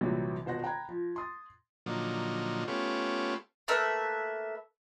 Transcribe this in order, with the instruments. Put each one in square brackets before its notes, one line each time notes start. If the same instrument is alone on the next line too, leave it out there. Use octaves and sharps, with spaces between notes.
[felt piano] A#1 C3 E3 F#3 G3
D#1 B2 C5 F#5 A#6
G5 A#5 B5 F#6 G#6
F3
C6 D#6 A6
[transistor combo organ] A#2 D3 F3 F#3 D#4
A3 B3 C#4 F4 G4
[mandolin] A3 A#3 B4 E5